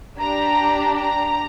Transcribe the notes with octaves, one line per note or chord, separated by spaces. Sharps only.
D4 G4 A#5
A#5